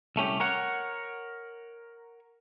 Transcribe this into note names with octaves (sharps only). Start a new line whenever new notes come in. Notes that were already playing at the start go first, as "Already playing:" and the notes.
C2 A3 C#4 G4
A#4 C#5 F#5